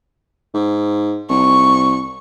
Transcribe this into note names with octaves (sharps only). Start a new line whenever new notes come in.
G#2
C2 C#6